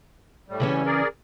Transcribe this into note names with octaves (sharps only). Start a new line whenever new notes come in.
A2 G3
C#3 E3 C#4
G#4 A#4 D5